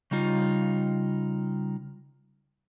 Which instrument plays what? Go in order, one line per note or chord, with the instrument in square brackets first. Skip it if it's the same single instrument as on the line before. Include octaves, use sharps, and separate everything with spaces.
[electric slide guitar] C#3 G3 D#4 F4